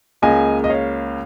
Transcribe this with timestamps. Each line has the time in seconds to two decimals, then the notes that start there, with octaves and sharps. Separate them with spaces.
0.22 C#2 C#3 A#3 D#5 G#5
0.64 D#5
0.69 C#5 F5